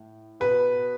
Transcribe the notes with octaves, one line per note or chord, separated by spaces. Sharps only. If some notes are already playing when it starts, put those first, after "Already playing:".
Already playing: A2
B2 B4